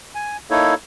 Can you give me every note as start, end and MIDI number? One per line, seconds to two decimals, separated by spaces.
0.15 0.37 80
0.50 0.74 58
0.50 0.74 63
0.50 0.74 64
0.50 0.74 69
0.50 0.74 73